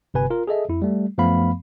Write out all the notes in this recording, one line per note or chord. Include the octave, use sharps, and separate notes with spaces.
G1 C3 B4 G#5
F4 A#4
G#4 A4 D#5 E5
F2 E4
G3 A3
F#2 F3 A3 B3 F5 B5